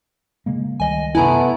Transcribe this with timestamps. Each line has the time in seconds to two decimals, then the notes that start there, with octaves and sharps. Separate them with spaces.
0.46 C#3 G#3 A#3
0.80 C#2 D#3 G3 D#5 G#5
1.15 F#2 C3 A3 B3 E4 G#5 A#5